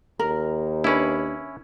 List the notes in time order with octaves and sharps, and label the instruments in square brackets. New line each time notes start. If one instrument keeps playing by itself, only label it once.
[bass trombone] D#2 [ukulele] A#4
[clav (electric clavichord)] C#4 E4 [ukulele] D4 B4